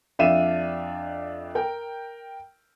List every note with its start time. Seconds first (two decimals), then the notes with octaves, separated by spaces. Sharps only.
0.19 F2 D4 E5 F5 D#7 E7
1.55 A#4 G5